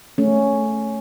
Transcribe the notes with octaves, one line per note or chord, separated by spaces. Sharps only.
A3 C#4